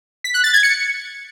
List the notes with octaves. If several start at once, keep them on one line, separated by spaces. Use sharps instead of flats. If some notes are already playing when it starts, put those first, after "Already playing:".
B6
F#6
A6
G#6
C#7